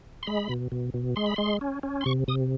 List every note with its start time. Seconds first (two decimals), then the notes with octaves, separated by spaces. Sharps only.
0.23 C6
0.27 G#3 B5
0.49 B2
0.72 B2
0.94 B2
1.16 G#3 C6
1.26 B5
1.36 G#3 C6
1.61 C#4
1.83 C#4
2.01 C6
2.06 C3 C#6
2.28 C3 D#6